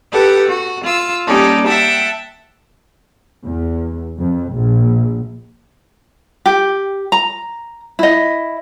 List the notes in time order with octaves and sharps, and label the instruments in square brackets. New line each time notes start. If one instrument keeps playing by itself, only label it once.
[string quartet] G4 A4 B4 F#5
F#4
F4 E6
G3 A#3 C#4 D#4 G4 A4
E5 F#5 G5 A5
[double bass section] E2
F2
A#1
[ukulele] G4
A#5
E4 D#5